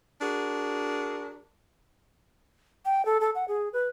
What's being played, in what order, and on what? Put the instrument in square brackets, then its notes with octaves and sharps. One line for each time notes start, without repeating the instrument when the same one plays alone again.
[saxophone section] D4 F#4 G#4 A#4
[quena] G5
A4
A4
F#5
G#4
B4